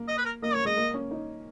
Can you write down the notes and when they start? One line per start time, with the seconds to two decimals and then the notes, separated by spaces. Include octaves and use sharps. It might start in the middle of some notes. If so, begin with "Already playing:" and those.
Already playing: A#3
0.08 D#5
0.18 B4
0.25 A#4
0.42 A#3 D#5
0.54 A#3 C#5
0.65 G#3 D#5
0.77 A#3
0.94 C#4
1.11 D#4